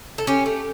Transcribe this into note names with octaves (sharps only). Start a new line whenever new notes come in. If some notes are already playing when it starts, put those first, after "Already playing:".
A4
C#4 G4
A3